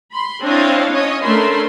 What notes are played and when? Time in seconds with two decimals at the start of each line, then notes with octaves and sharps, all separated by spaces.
0.12 B5 C6
0.42 C4 D4 E4 C#5 D#5 F5
0.89 C#4 C#5 D#5
1.22 A3 C#4 D4 A#4 B5 C6